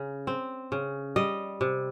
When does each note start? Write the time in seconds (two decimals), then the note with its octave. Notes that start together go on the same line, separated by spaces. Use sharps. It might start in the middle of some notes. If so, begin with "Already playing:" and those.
Already playing: C#3
0.27 C4
0.72 C#3
1.16 G3 D#5
1.61 C3